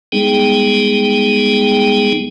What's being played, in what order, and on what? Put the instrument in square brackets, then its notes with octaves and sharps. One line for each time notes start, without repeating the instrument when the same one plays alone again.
[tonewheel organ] G3 G#3 B3 D#4 G#4 G5